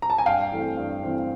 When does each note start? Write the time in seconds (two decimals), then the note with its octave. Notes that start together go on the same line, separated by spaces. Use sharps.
0.02 A#5
0.10 A5
0.18 G#5
0.26 G2 F5 G5
0.52 E3 A3 C4
0.77 G2
1.03 E3 A3 C4